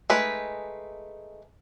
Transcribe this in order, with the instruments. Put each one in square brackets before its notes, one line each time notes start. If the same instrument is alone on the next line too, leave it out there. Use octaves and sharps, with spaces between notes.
[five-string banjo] G#3 A3 D#4 B4